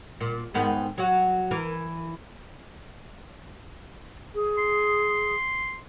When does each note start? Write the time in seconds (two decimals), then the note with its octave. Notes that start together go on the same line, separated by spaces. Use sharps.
0.21 A#2
0.54 G#2 D#3 B3
0.98 F#3 F#4
1.51 E3 A#4
4.34 G#4
4.58 C6